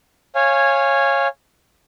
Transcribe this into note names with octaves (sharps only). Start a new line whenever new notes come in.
C#5 F5 G#5